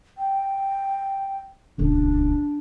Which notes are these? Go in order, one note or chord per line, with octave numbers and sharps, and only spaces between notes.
G5
D#1 C#2 D4